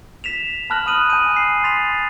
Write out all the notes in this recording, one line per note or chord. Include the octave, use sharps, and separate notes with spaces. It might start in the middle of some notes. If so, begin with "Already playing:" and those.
B6 E7 F7
A5 B5 F6 F#6 A#6 F#7
A5 D#6 F6 D#7 F#7
G#5 G6 D#7
C7
C6 A6 B6 F7